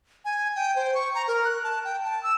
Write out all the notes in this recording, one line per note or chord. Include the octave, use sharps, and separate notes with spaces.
G#5
G5
C5
C#6
A#5
A#4
F#6
A5
G5
A5
E6